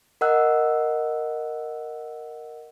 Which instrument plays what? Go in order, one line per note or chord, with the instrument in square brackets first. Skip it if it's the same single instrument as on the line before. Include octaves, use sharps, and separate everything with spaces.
[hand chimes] A#4 D#5 F#5 E6 F#6